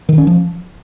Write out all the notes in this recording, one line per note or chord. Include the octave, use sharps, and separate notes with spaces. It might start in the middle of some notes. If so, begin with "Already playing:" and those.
D#3
C#4
F3